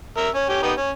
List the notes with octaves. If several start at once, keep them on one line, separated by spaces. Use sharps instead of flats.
A#4 E5
C#4
C#4 G4
B3 D#4 G4
C#4